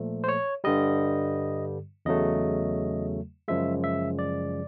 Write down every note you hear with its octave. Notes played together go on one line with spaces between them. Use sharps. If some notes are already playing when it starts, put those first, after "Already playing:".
Already playing: A#2 F3 A3
C5
C#5
G2 D3 G3 D#5
E2 C#3 F#3 A3 D#5
F#2 C#3 F3 G#3 E5
E5
D5